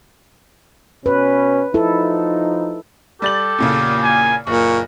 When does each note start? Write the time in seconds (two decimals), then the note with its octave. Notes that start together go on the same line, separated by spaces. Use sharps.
1.06 B2 C#4 B4
1.74 F3 D#4 E4 A4
3.22 G3 G4 A4 A6 F#7
3.58 E2 A#2 C#3
4.03 G#5
4.47 F#1 A#2 C#6